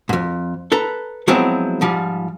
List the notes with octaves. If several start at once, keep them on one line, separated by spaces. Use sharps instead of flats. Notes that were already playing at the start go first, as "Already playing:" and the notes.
F2 G#2
A4 B4 A#5
F3 F#3 G#3 B3 C4 E4
G#2 F3 G3